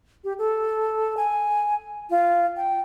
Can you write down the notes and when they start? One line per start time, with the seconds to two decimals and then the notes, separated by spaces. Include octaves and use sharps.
0.24 G4
0.39 A4
1.17 G#5
2.10 F4
2.57 G5